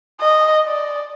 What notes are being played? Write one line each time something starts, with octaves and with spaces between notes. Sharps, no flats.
D#5
D5